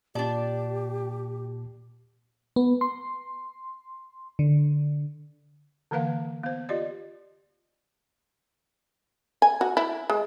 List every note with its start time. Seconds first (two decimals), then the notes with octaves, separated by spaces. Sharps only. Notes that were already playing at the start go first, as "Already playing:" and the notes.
0.15 A#2 D4 G4 D5 A5
2.56 B3
2.81 C6
4.39 D3
5.91 D3 E3 A#3 B4 F5 F#5
6.43 B3 C5
6.69 F4 G4 D5 D#5
9.42 G#5
9.61 F#4
9.77 E4
10.10 G#3